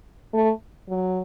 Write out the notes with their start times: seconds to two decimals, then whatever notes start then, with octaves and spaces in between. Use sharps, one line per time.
0.34 A3
0.89 F#3